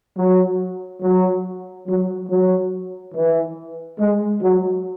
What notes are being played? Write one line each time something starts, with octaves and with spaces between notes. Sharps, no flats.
F#3
F#3
F#3
F#3
E3
G#3
F#3